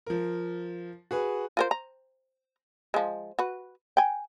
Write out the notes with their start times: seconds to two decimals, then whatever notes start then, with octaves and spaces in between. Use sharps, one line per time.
0.07 F3 A#4
1.11 F#4 G#4 B4
1.57 F4 A#4 C5
1.71 A#5
2.94 F3 G#3
3.39 F#4 B4
3.97 G5 G#5